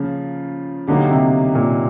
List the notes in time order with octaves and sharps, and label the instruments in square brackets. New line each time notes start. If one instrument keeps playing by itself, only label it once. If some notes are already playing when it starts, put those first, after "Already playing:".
Already playing: [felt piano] C#3 [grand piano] F3 A#3 C#4 F4 A#4
[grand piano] B2 F#3 A#3 D#4 G4 [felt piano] D3
[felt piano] C3
A#2